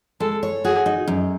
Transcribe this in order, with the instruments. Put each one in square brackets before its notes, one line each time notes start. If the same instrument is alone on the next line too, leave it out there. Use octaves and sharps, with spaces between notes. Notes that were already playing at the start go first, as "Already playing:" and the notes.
[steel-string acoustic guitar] G#3 [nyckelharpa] A4
[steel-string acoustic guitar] C#5
[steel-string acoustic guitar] F#4 [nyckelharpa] G#4
[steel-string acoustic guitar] D#4
F#2